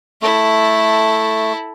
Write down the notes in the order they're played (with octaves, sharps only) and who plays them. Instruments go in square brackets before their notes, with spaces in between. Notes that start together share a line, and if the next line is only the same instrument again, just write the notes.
[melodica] A3 [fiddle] E4 A4